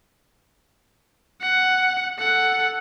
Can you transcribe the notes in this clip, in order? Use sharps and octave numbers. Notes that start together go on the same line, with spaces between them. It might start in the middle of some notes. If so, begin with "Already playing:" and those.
F#5
A4 F#5